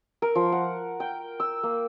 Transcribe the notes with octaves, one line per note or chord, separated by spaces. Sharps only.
A#4
F3
F#5
G5
E6
A#3